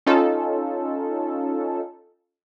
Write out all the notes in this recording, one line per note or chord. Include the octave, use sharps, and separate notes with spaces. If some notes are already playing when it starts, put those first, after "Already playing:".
C#4 D#4 F4 A4